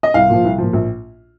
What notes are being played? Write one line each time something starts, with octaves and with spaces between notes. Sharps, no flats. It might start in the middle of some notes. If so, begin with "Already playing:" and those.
D#5
C2 F5
A#2 F3
C2
A#2 F3
A#1